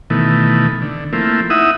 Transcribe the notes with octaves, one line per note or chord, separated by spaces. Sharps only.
B2 D#3 E3 A3
D3
F3 A3 A#3 C4 E4
D#4 E4 E5 F#5 D#6